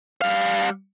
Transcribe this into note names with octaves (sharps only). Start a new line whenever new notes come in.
G3 F5